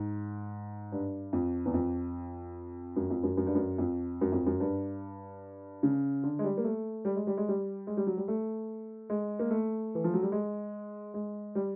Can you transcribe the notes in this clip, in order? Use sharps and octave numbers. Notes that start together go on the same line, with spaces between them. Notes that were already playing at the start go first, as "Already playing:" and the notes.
Already playing: G#2
G2
F2
E2
F2
F#2
F2
F#2
F#2
G2
F#2
F2
F#2
F2
F#2
G2
C#3
D3
G#3
G3
A#3
A3
G3
G#3
G3
G#3
G3
G#3
G3
F#3
G3
A3
G#3
A#3
A3
E3
F3
F#3
G3
G#3
G#3
G3